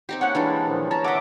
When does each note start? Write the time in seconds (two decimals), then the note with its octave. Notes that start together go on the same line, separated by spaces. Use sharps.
0.09 C4 D#4 G4
0.21 A#3 C#4 F#5
0.35 E3 G3 G#3 D4
0.68 A#2 D#3 F3
0.91 C#4 A5 A#5
1.04 A#4 D#5 E5 F#5 D6